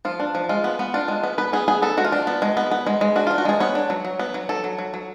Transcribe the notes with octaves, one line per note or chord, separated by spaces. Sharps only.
F3 F4
D4
F3
G#3 F4
B3
B3
D4 F4
G#3
B3
B3 B4
B3 G#4
B3 G#4
B3 A4
G#3 F#4
F4
D4
B3
G#3
B3
B3
G#3
G#3
D4 F#4
D4 F4
F#4
G#3 G#4
B3 C#5
D4
F#3
F#3
B3
F#3
F#3 A4
F#3
F#3
F#3